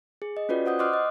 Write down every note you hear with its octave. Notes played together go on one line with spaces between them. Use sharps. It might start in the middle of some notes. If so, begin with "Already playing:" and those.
G#4
D#5
C#4 F4 F#4 B4 D5
C5 F#5 D#6 G6
D#5 C6 D6 D#6 F6 F#6
D#5